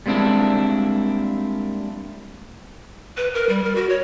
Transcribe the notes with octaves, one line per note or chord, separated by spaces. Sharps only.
G3 G#3 A#3 C4 D4 E4
B4
A#4
G3
A#4
F#4
C#5